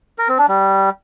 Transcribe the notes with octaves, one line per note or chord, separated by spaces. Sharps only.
A#4
C4
D4
G3